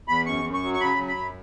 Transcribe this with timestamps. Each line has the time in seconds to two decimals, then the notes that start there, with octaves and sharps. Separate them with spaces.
0.08 E2 B5
0.26 F#2 C#6
0.44 F#2
0.54 C#6
0.63 F#3
0.73 C#6
0.80 C#3 B5
0.99 F#3
1.08 B5
1.17 F#2